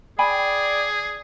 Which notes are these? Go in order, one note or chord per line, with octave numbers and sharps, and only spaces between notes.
G#4 D5 G5 G#5 B5